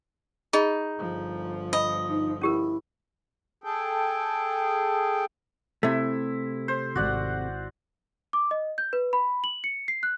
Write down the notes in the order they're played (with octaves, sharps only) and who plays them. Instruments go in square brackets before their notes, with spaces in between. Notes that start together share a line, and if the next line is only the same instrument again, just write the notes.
[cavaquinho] D#4 [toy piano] G#4 D#5 B5
[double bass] G1 F3
[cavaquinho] D#5 [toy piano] B5
[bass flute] D#4
[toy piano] C#4 G4 A#4 [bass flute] E4
[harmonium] G#4 A4 G5
[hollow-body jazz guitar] C3 A3 [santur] E4
[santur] C5
[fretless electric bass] D#1 G#1 [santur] F#4 D5 F#5
[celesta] D6
D#5
G6
B4
B5
F#7
C#7
C7
F#6